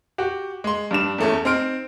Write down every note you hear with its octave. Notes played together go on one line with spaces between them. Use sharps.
F#4 G4
G#3 C6
G2 D4 E7
E2 A3 C#4
C4 D#4 C6 F6 D7